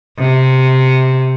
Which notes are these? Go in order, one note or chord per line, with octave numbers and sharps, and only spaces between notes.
C3